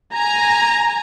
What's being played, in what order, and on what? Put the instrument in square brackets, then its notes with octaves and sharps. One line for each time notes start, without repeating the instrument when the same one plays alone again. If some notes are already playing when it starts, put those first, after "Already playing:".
[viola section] G#5 A#5